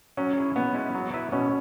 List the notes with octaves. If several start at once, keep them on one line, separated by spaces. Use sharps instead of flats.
F#3 C#4
E4 G#4 C#5
B2 B3
G#3 C#4 E4 B4
F#3
E4 B4 E5
B2 C#4